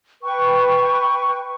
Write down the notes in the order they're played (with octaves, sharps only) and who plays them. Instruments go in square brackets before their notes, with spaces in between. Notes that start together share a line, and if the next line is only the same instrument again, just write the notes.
[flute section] B4 G5 C#6